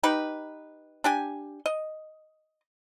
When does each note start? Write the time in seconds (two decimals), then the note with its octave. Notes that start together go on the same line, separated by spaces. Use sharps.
0.03 D#4 G4 B4
1.04 D4 G4 G#5
1.66 D#5